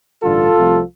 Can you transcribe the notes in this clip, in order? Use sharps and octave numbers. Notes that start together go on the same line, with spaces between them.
A1 G2 D3 F4 A4
C2 C3 F3 A3